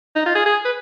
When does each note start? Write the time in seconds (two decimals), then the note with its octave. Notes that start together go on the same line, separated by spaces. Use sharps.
0.16 D#4
0.26 F4
0.35 G#4
0.46 G#4
0.65 B4